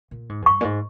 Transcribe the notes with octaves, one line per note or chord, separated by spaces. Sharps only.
A#2
G#2
E2
G2 C#6
A#2
G#2